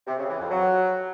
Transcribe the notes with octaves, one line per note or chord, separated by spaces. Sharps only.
C3
C#3
E3
F2
F#3